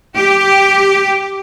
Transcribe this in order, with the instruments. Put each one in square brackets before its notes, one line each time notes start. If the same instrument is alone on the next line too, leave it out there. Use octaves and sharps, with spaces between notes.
[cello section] G4